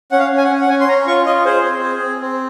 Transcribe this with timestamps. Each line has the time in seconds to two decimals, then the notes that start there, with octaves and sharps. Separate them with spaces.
0.12 C#4 F#5
0.19 F5
0.31 C#4
0.37 G#5
0.44 F#5
0.50 C#4
0.61 F#5
0.69 C#4 G#5
0.81 C6
0.88 C#4 A#5
1.07 F4 C#6
1.26 F4 D#5
1.45 G#4 C5
1.64 C4
1.83 G#4
2.02 C4
2.21 C4